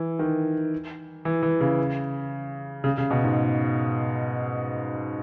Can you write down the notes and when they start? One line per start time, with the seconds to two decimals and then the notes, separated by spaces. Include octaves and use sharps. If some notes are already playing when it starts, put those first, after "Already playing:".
Already playing: E3
0.19 D#3
1.25 E3
1.43 E3
1.61 C#3
2.84 C#3
2.98 C#3
3.11 B2
3.24 G#2